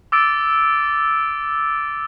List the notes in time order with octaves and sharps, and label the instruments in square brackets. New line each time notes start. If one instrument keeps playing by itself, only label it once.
[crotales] D6 E6 A6 D7